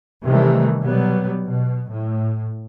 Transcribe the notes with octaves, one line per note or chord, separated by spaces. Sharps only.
C3 D#3 E3 G3 A3
B2 F#3 G3 B3
B2
A2